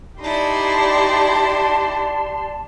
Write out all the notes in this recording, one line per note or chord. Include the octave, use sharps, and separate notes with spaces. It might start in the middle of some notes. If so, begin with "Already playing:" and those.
D#4 E4 G4 D5 A5 C6